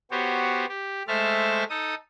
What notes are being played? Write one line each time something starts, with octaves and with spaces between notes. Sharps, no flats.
B3 F#4 G4 C5 C#5
G4
G#3 A3 C5 E5 A5 F6
D#4 A4 D#6